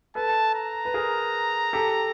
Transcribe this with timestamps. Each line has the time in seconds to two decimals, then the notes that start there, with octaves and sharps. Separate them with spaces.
0.15 A4 B4 A5
0.55 A#5
0.85 B4
0.94 G#4 A#4
1.73 G4 A4